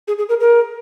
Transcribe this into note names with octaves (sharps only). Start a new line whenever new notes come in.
G#4
G#4
A#4
A#4